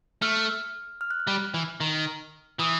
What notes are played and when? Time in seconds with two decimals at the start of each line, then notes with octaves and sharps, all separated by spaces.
0.22 A3 F6
1.01 F6
1.11 F#6
1.20 F6
1.27 G3
1.54 E3
1.81 D#3
2.59 E3 D#6